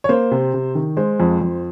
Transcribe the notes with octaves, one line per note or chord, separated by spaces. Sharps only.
C#5
A#3 C5
C3
C3
D#3
G#3 C5
F2
F2